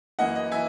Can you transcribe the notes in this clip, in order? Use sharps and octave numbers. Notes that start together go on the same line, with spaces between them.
F#2 E3 A#3 D#5 F#5
D#5
E3 E5 G#5